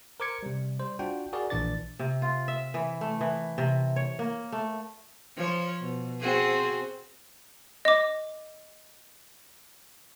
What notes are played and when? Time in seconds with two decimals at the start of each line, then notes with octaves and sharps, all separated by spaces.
0.20 A#4 C5 D6 G#6 C#7
0.43 C3 G3
0.80 G3 C5
0.99 D4 F4 F#4 D5 G5
1.33 F#4 G#4 A#4 D5
1.50 A#1 A#2 E3 D4 D5 A6
1.99 C3
2.22 F4
2.48 E5
2.74 E3
3.01 A3
3.21 E3
3.58 C3
3.96 C#5
4.19 A#3
4.52 A3
5.37 F3 C#5
5.81 B2
6.20 C4 F#4 G#4
7.85 D#5 D6